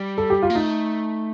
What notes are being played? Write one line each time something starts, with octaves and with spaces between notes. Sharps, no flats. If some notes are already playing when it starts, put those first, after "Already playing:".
Already playing: G3
A4
G4
F4
A#3
A3 D#4